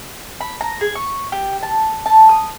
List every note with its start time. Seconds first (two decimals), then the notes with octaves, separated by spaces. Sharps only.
0.41 B5
0.61 A#5
0.81 G#4
0.95 C#6
1.32 G4
1.63 A5
2.06 A5
2.29 D#6